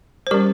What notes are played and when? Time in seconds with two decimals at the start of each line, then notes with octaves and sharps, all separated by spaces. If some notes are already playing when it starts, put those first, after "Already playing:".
0.27 C5
0.31 G3 C#4 G4 A#4